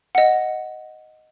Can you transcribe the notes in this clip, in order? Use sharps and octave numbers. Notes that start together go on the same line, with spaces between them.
D#5 F#5